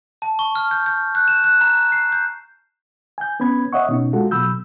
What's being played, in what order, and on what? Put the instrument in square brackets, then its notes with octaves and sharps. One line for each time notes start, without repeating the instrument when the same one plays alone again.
[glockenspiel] A5
C#6
F6
G6
G6
F#6
E7
F#6
A#5
C7
G6
[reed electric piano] G#5 G6
B3 C#4 B5 G#6
C#5 D#5 E5 F#5 C#6
B2 C#4 D#4
G#3 F4 F#4 A4
B2 F#3 B5 E6 G6